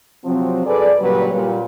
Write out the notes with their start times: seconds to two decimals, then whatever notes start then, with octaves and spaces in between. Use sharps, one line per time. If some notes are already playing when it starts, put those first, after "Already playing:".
0.25 C3 F3 F#3 C4
0.66 G2 G#4 A4 B4 D5
1.00 A#2 C#3 F#3 G3 C#4 B4
1.33 A#2 G3 A#3